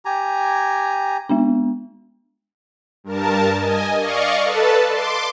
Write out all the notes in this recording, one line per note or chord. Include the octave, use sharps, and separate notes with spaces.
G4 G#5 A#5
G#3 B3 D4
G2 A#4 A5
D#5 G#5
D5 D#5 F5 C#6
A4 B4 A5
C6 D6